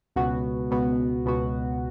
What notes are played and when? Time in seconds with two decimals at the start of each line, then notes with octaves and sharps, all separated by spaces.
0.16 C#2 B2 B3 F#4
0.71 C#2 B2 B3 F#4
1.25 C#2 B2 B3 F#4